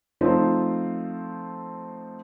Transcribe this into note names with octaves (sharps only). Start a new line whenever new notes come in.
F3 A3 C4 D#4 F4 C5